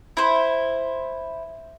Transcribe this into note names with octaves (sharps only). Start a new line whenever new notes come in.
E4 C5